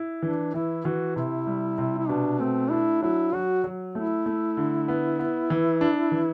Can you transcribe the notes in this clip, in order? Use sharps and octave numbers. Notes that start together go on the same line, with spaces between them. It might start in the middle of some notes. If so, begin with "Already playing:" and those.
Already playing: E4
E3 D4
E3 E4
E3 F#4
C3 E4
G3
C3
E4
B2 D4
A3 C4
D4 E4
F#3 E4
F#3 F#4
F#3
A3 E4
A3
D3
B3
B3
E3
D4
E3